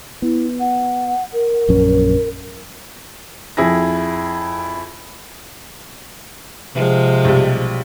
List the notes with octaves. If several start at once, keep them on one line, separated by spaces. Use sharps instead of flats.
B3 E4
F#5
A#4
A#1 F#2 C#4
F2 E4 G#4 A#6
C3 F3 G#3
B1 G3